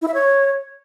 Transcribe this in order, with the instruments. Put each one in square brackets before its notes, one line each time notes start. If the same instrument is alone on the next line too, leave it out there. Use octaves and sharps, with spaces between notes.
[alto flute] E4
E5
C#5